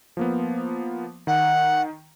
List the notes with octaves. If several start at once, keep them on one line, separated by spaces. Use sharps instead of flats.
F3 A#3 B3
D#3 F#5